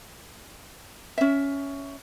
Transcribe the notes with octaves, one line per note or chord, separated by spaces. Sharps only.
C#4 E5